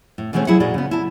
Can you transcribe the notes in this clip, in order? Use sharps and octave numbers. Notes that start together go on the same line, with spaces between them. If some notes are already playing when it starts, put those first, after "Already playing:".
A2
B2 E3 G#3 A3 C4 C#4
F#3 E4 G#4 E5 F#5
A#2 G#3 F#4 D5
C#3 B3
E4 A5